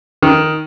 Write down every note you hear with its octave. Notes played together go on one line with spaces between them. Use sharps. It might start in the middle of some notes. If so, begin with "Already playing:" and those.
D#3